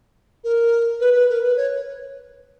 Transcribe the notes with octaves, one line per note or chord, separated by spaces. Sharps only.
A#4
B4
B4
A#4
B4
C#5